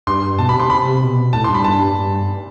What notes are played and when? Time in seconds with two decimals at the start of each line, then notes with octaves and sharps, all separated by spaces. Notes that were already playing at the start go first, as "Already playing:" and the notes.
0.07 G2 C6
0.38 B2 A5
0.49 B5
0.55 C3 C6
0.70 C3 B5
1.02 B2
1.33 A2 A5
1.44 C6
1.49 G2
1.54 B5
1.64 A5